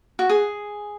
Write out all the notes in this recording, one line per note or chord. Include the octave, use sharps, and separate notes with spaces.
F#4
G#4